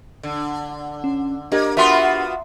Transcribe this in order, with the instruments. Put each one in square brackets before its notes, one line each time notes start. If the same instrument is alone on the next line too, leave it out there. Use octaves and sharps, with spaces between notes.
[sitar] D3
[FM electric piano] C#4
[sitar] A#3 [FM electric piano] D4 G4 A#4 [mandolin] D#5
[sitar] B3 F4 F#4 [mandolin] E5 A#5 C6